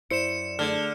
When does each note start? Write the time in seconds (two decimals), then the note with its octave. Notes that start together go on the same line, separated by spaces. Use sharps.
0.11 F#2 E4 C5 D5 C#7 E7
0.59 D3 A3 G#4 F6